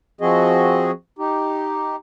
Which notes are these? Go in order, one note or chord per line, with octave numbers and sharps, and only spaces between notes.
F3 C4 F#4 G#4 D#5
D#4 G4